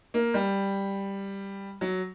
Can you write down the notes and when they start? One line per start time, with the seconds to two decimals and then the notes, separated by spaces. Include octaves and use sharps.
0.14 A#3
0.34 G3
1.81 F#3